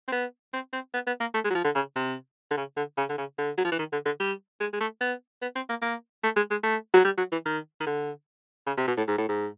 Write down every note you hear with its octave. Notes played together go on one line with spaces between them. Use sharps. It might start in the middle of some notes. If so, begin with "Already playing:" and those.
C4
B3
C4
C4
B3
B3
A#3
A3
G#3
F#3
F3
D3
C#3
C3
D3
C#3
D3
C#3
D3
C#3
D3
F#3
F3
E3
D#3
D3
D3
G3
G#3
G#3
A3
B3
B3
C4
A#3
A#3
A3
G#3
G#3
A3
F#3
G3
F#3
E3
D#3
D#3
D3
C#3
C3
B2
A2
G#2
A2
G#2